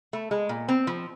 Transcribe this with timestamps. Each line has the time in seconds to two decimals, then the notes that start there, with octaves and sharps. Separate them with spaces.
0.13 A3
0.31 G#3
0.49 A#2
0.68 C4
0.87 F3